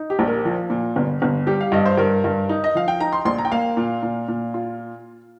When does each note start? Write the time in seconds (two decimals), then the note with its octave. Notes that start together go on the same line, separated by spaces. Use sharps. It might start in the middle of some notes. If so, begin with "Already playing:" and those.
Already playing: D#4
0.10 G4
0.19 A#1
0.28 A#4
0.45 F3
0.70 A#2
0.96 G1
1.22 G1
1.47 G3 G4
1.61 F5
1.72 G2 D#5
1.86 C5
1.98 G2 A#4
2.24 G2
2.49 D#4
2.64 D#5
2.75 F3 F5
2.88 G5
3.00 D#4 A#5
3.13 C6
3.25 A#1 C6
3.38 A#5
3.45 G5
3.51 A#3 F5
3.77 A#2
4.03 A#2
4.28 A#2
4.54 F4